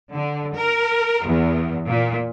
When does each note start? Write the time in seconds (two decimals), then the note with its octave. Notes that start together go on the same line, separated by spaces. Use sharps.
0.13 D3
0.55 A#4
1.24 E2
1.86 A#2